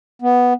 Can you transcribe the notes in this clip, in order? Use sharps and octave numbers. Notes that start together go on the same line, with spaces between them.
B3